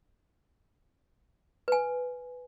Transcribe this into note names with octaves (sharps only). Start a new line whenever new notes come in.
B4 G#5